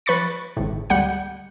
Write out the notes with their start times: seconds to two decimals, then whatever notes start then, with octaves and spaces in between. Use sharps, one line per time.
0.06 F3 B4 B5 C#6 A6 C#7
0.57 G#1 A2
0.90 D2 G3 G#3 F#5 G6 C#7